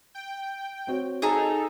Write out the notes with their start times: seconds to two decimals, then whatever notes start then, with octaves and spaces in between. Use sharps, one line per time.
0.15 G5
0.87 C4 F#4 C#5
1.22 D#4 G#4 A4 A#5